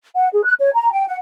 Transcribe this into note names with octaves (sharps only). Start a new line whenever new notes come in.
F#5
G#4
F#6
C#5
A#5
G5
F#5